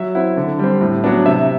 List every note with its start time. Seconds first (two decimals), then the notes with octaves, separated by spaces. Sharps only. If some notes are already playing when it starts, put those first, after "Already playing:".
Already playing: F#3 E5
0.15 C4 E4 F#5
0.37 D3
0.59 G3 C4
0.81 A2
1.04 F#3 B3 D4
1.26 C3 E5